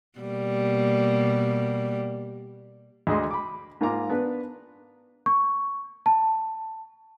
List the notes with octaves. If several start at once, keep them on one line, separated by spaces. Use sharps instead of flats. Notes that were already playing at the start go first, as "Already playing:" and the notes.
B2 G3 A#3
D2 G#3 D#5 C6
B5 D6
G#2 A#3 F4 A#5 D6
B3 D4 B4
C#6
A5